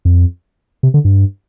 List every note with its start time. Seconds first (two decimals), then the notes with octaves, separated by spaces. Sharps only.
0.05 F2
0.83 C3
0.94 D3
1.05 G2